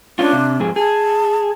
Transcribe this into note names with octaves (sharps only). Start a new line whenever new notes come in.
C#4 D4 F4
C3
F2 G#2 G#4
G#4 A5